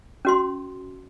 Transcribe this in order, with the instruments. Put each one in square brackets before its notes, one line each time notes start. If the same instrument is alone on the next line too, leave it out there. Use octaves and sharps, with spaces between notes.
[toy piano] C#4 F#4 C6